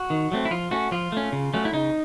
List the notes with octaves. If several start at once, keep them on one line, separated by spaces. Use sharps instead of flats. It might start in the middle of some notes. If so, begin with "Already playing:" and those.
Already playing: F#4
D#3
F#3 A3 C4
E4
F3 F4
A3 C#4 F#4
F3 F4
A3 C#4
C#3
F#3 A3 C#4
E4
C#3 D#4